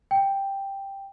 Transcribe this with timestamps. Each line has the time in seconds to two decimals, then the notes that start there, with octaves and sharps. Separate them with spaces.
0.11 G5